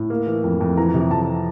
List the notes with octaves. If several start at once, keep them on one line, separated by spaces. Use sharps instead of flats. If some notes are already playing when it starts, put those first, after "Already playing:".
Already playing: A2
A#3
E3
F2
F2
E3 A#5
C3
F2 A5